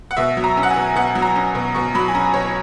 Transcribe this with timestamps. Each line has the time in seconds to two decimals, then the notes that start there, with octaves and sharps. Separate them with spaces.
0.11 F#5
0.17 B2 E5
0.37 F#3
0.44 A#5
0.57 C#4
0.63 F#5
0.70 G#5
0.76 B2
0.96 B2 F#5
1.15 F#3
1.22 A#5
1.36 C#4
1.55 B2
1.75 B2 C#6
1.95 F#3 B5
2.08 G#5
2.15 C#4 A#5
2.34 B2 C#5